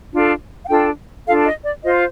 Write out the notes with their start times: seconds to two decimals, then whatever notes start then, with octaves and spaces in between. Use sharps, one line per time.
0.12 D4 F4 A4
0.65 F5
0.69 D4 F4 A4 G5
1.26 D4 F4 A4 F5
1.46 D#5
1.64 D5
1.84 F4 C5 D#5